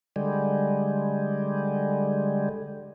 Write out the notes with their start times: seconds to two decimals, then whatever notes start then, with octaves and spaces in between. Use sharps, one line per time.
0.16 D3 G3 G#3